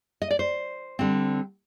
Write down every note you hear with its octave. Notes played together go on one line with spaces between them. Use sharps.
D#5
D5
C5
D3 G3 C4